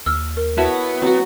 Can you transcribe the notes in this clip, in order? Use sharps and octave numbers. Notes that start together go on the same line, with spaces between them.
D#2 E6 F6
A#4
B3 E4 F#4 C#5 E5 A5
F#3 C4 F#4